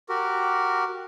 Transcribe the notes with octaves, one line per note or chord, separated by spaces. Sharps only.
F#4 G4 A#4